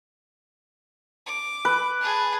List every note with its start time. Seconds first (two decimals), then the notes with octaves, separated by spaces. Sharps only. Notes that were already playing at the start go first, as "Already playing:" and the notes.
1.26 D6
1.65 B4
2.00 G#4 A5